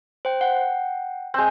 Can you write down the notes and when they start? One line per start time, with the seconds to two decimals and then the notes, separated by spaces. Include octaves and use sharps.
0.25 C5 G5
0.41 F#5 G5
1.34 G#3 C4 G6